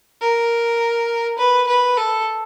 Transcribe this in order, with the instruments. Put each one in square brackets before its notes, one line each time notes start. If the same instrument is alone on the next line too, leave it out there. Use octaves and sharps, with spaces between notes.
[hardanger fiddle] A#4
B4
B4
A4